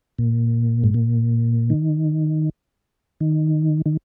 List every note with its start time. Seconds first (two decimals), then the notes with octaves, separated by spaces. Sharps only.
0.19 A#2
0.84 G#2
0.94 A#2
1.70 D#3
3.20 D#3
3.86 D#3